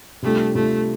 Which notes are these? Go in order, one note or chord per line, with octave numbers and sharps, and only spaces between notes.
C3 G3 A3 D4 F4
C3 G3 A3 D4 F4